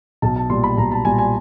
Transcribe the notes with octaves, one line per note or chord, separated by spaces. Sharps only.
B1 A5
A5
A#2 G3 C6
B5
B1 A#5
A5
A#2 G3 G#5
G#5